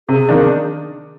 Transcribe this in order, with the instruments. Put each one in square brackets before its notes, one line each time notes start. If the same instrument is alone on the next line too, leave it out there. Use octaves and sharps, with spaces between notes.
[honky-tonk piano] C3 [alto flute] G#4
[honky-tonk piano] D#3 A#3 D4